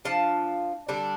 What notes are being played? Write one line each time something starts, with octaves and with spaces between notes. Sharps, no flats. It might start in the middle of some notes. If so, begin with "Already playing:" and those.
F3 D4 F4 A5
D3 G3 D4